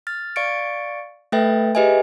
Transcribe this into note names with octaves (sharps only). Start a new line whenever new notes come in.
F6 A6
D5 F5 C#6 A6 C#7 D7
A3 A4 B4 E5 G5 A6
G4 G#4 B4 D#5 E5 G#5